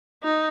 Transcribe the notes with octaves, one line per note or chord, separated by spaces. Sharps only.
D#4